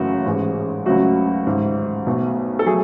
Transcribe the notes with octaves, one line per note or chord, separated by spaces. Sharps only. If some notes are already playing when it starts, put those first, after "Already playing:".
Already playing: F#1 F#2 C#3 E3 A3 F#4
A1 G#2 E3 G#3
C#2 C#3 F#3 A3 F#4
A1 G#2 D#3 A3
B1 B2 A3
A4
F#3 A3 G#4